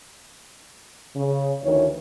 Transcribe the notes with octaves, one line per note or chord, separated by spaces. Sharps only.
C#3
D2 D#3 E3 C#5